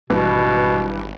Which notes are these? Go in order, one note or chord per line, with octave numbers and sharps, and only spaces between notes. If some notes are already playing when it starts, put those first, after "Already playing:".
G#1 G2 B2 E3